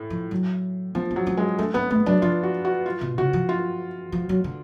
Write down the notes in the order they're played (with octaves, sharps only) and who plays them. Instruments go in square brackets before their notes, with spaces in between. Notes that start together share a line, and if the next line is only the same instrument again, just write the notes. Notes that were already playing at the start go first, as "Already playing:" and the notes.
Already playing: [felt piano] A2
[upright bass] F3
F#3
[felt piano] F3 [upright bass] B3
[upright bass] D4
[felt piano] F#3
[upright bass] C#4
[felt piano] G#3
[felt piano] A3 [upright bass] D4
[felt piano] B3 [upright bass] C#4
[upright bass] A3 [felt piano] B3
[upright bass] F#3 [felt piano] D4
[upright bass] F3 [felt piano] F4
[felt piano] F#4
F#4
F4
[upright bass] B2
[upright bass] C#3 [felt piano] F#4
[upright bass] F3
[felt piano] F4
[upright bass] F3
F#3
D3